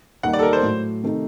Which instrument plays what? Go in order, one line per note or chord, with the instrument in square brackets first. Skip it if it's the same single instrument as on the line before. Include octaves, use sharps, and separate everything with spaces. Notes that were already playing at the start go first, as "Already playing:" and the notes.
[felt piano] D#2 D#3 G3 A#3 D#4 [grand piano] F#5
[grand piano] D5
A4
A#4
C5
[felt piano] A2 F#3 A3
C3 D#3 A3 D#4